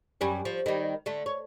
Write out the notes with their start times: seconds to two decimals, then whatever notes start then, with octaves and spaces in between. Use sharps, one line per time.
0.21 F#2 G3 C#4
0.45 F3
0.66 D#3 G3
1.06 D3 A3
1.26 C#5